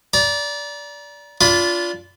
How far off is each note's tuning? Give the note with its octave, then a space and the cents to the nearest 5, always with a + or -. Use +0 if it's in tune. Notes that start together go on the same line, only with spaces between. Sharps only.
D5 -20 A#5 +30
D4 -25 F4 +0 B5 +15